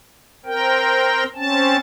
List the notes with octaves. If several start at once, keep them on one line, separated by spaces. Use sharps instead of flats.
C4 A#4 G5
C4 C#4 A5